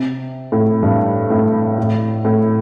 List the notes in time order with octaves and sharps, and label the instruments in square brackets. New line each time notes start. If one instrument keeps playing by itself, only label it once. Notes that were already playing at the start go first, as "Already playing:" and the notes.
Already playing: [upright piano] C3
A2
G2
A2
A2
A2